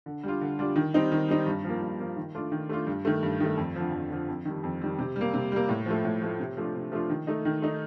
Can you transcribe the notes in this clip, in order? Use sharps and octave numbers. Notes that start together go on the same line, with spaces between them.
D3
G3 D4 F4
D3
G3 D4 F4
D#3
G3 C4 D#4
D#3
G3 C4 D#4
G2
F3 A#3
G2
F3 A#3
D#3
A3 D4 F4
D#3
A3 D4 F4
G2
D#3 A3
G2
D#3 A3
F2
D3 F3
F2
D3 F3
F2
D#3 G3
F2
D#3 G3
C3
G3
A#3
C3
G3 A#3
A2
F3 A3
A2
F3 A3
C3
F3 A3 D4 F4
C3
F3 A3 D4 F4
D#3
A3 D#4
D#3
A3 D#4